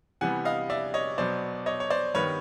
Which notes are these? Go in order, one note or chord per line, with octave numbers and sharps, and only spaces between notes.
C3 E3 G3 B3 F#5 G#5
D#5 F5
D5 E5
C#5 D#5
B2 F#3 B3 C5 D5
C#5 D#5
C#5
C5 D5
G2 D#3 G3 B3 B4 C#5